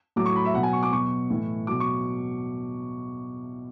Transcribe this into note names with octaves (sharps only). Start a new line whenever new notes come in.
A2 F#3 D6
C#6
B5
E5
B2 F#3 F#5
G#5
C#6
D6
B2 F#3 C#6
A2 E3
B2 F#3 D6
C#6